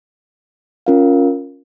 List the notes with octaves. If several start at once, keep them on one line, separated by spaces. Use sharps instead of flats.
C#4 F4 A#4 F5